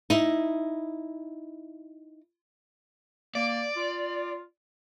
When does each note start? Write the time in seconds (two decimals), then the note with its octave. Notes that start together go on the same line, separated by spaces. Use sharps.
0.10 D#4 E4
3.35 A#3 D5
3.76 F4